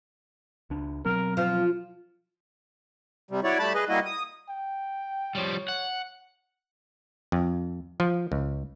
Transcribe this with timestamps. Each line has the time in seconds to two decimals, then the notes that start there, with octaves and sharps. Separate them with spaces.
0.70 C#2 D4
1.05 B2 F#3 C4 A#4
1.37 F3 F5
3.31 C3 G3
3.44 E4 F#4 C#5 D5
3.59 G3 A3 A5 B5
3.75 G#4 B4 D#5
3.89 G3 A#3 E4 F#4 D#5
4.05 D#6
4.49 G5
5.35 F3 G3 C#5
5.68 F#5
7.32 F2
8.00 F3
8.32 C#2